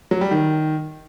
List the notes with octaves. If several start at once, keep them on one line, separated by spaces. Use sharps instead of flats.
F#3
G3
D#3